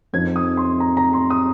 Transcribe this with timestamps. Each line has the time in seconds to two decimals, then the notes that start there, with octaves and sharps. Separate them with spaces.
0.13 F2 F3 C4 D#4 G#6
0.36 D#6
0.57 C6
0.80 A#5
0.97 A#5
1.13 C6
1.30 D#6